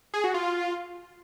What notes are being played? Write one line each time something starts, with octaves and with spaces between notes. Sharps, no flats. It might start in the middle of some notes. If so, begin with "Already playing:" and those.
G#4
F#4
F4